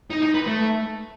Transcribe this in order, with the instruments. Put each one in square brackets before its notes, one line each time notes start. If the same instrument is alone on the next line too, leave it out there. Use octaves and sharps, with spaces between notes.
[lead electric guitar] D#4
D#4
B4
A3